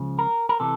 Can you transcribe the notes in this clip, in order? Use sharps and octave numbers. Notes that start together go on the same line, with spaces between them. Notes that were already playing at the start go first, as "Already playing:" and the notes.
Already playing: C#2 C#3 F3
A#4
A#4
C3 E3 A4